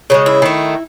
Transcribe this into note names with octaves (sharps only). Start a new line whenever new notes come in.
C#3 E3 G#3 F#4
E4
D#3 A3